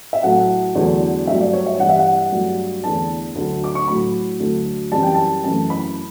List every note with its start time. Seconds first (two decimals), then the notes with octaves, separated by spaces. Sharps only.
0.13 E5
0.23 A2 F#3 A3 F#5
0.75 E2 D3 F#3 A3
1.27 G2 F#3 A3 E5
1.41 D5
1.53 C#5
1.66 E5
1.79 G2 E3 G3 F#5
1.89 E5
1.99 F#5
2.31 G2 F#3 A3
2.83 E2 D3 A3 A5
3.35 D2 D3 F#3
3.64 D6
3.75 C#6
3.88 A2 F#3 A3 B5
4.40 D2 D3 F#3 A3
4.92 F#2 E3 G3 A5
5.03 G5
5.14 A5
5.44 F#2 E3 A3 A5
5.70 B5